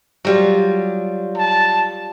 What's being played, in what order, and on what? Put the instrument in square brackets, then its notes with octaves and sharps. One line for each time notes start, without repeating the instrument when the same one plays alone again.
[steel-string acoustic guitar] F#3 G3 F4
[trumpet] A5